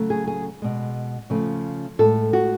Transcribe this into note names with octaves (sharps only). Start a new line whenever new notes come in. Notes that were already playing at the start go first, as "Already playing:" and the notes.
Already playing: C#3 F#3 A3
G#4
G#4
B2 G#3
C#3 F3 A3
A2 G#3 A4
F#4